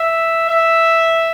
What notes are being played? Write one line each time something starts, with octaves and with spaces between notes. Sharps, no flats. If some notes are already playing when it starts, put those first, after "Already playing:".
Already playing: E5
E5